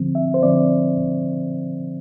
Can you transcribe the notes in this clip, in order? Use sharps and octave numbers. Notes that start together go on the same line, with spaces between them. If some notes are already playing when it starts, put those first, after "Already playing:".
Already playing: D3 F3 C4
E5
C5
D3 F3 C4 D5